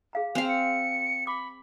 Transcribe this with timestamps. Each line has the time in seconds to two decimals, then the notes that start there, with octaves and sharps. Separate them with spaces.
0.13 G#4 F5 A#5
0.35 C4 F5 G#5 F7
0.49 C#7
1.27 B5 D6